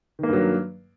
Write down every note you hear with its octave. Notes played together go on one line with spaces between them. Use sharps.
G2 D#3 F#3 A#3